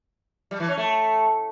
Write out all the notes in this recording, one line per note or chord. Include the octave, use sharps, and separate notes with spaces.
G3
E3
C#4
A3